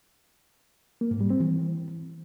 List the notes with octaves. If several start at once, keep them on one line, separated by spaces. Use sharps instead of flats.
A#3
G#2
G3
C4
E3